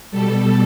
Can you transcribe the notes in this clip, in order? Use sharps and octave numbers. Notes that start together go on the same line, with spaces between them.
B2 G3 A4